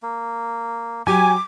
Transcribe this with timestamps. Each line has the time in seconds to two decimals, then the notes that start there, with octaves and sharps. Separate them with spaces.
0.03 A#3
1.07 F#3 G4 G#5 D6